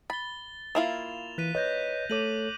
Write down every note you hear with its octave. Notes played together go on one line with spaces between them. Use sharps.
B5 A6 G7
A#3 E4 F4 E7 F7
E3 F#6 B6 D#7
B4 C#5 D#5 F#6 G6 A#6
A3 A4 C#5 D6 D#7 F#7